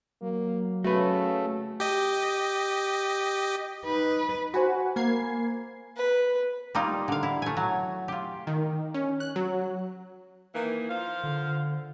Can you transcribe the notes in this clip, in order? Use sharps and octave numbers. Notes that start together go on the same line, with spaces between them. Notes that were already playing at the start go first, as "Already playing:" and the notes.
F#3 A#3
C#3 A3 F#4 B4
G4 D#5
D#4 B4
F#4 C5 G#5 B5
A#3 G#6 C7
B4
G3 A#3 D#4 F4
D3 F5
E4
A3 G#5
F#3
F4 G4
D#3
C#4
F#6
F#3
D#3 E3 A#3
F3 F4 F5
D3